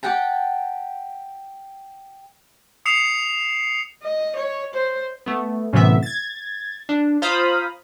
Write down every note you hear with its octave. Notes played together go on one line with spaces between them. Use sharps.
G4 F#5 G5 A5
D#6 C7 C#7 E7 F7
D#5
C#5
C5
A3 B3
F#2 A2 C3 E3 B3 E5
G#6 A6
D4
F4 C5 F5 A#5 B5 D#6